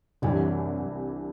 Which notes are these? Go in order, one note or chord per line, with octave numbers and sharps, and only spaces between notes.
C2 F#2 C3 E3 G3 D4